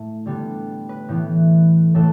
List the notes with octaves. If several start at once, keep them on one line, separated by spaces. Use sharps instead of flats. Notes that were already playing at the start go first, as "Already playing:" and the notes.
Already playing: A2 A3
D3 G3 B3
B4
A2 E3 B3
A2 E3 A3 A4